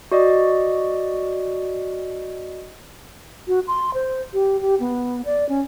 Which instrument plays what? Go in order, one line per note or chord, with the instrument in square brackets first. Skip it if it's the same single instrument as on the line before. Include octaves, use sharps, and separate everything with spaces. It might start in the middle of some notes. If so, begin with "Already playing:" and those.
[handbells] F#4 D5 D#5
[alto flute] F#4
C6
C5
G4
G4
B3
D5
C#4